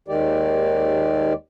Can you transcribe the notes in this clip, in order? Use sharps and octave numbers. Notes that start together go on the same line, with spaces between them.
D#2 D#3 G#3 G4 D5